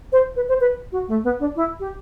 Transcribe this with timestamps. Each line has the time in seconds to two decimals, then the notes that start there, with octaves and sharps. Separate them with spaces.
0.12 C5
0.36 B4
0.49 C5
0.61 B4
0.92 F#4
1.08 A3
1.24 B3
1.40 D4
1.56 E4
1.80 G4